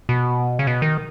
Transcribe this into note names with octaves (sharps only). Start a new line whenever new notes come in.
B2
C#3
B2
D#3